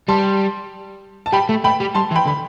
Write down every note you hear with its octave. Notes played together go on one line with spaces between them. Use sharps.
G3 A5 C6
A5
G3 G5 B5
A3
A3 G5 B5
G3
G3 A5 C6
E3
G5 B5
D3 B5